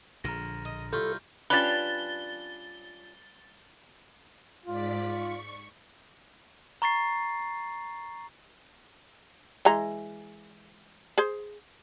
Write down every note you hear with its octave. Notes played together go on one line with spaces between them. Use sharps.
A#1 D3 A#5 F6 A#6
D#5
C2 F4 A4 B5 C#6 F6 G6
G3 C#4 D4 F4 B4 A6 G7
G#2 F4 D5 B6
C#6
A#5 C#6 A6 C7
E3 G#3 A#5
G#4 C5